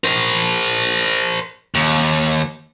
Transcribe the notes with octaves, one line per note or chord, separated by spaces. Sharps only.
A#4 C5
D#2